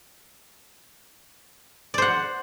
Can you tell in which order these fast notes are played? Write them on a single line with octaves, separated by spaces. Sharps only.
D5 C5 F#5